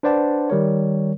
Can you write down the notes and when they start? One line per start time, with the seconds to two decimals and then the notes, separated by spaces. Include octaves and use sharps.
0.03 D4 B4 C5 D5 F#5 A5
0.50 D#3 G3 A#4 C#5